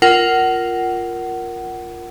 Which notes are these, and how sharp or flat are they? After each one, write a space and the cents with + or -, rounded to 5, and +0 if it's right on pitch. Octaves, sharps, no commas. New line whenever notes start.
F4 +0 A#4 +0 F#5 +25